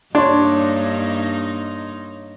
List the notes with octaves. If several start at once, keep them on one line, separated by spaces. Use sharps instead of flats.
G2 A#3 D4 D#4 C#5 C6